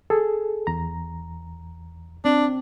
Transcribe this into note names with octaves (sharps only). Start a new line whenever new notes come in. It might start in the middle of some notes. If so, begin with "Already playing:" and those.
G#4 A4
E2 A#5
C4 D4